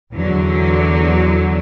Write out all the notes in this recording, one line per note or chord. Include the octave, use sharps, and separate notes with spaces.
E2 D3 F#3